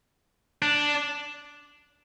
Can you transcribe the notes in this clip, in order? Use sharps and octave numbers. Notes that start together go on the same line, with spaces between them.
D4